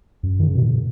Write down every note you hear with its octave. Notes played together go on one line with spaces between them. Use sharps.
F#2
D#3
C#3
B2
A#2